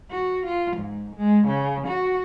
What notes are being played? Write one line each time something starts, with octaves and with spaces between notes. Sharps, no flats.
F#4
F4
G#2
G#3
C#3
F#4